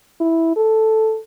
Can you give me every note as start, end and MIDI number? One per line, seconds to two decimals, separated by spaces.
0.21 0.54 64
0.56 1.19 69